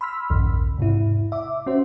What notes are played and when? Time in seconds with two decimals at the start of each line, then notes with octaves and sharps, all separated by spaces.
0.01 B5 C6 E6 F6 B6
0.30 A#1 E2 G2 C#3
0.78 G#2 C3 E4
1.32 E5 D6
1.67 C#4 F#4 C5